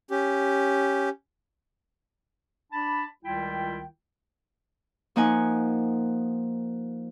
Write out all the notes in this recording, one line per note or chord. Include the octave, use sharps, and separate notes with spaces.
C#4 G4
D4 A5 B5
C#2 D#3 G3 E4 F4 G5
F3 A#3 D#4 F#5 G#5